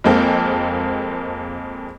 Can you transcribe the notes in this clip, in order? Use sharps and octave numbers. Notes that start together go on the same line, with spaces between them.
F2 G#3 A#3 C4 A4